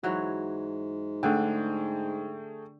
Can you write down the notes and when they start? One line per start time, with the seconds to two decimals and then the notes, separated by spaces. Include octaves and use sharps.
0.04 G#2 E3 F#3 C#5
1.23 D3 A3 G#4 G5